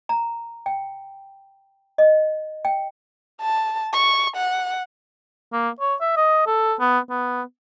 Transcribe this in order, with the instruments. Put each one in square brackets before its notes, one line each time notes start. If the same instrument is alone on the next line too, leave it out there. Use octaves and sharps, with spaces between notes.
[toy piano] A#5
G5
D#5
G5
[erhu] A5
C#6
F#5
[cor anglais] A#3
C#5
E5
D#5
A4
B3
B3